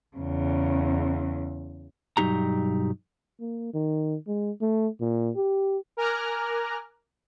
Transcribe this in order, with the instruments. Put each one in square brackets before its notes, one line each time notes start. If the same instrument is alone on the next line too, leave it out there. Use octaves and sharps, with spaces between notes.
[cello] E2 C#3
[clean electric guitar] B1 G2 F#3 D#4 G4 A#5
[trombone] A#3
D#3
G#3
A3
A#2
G4
[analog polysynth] A#4 G#5 A#5 D6 F6 F#6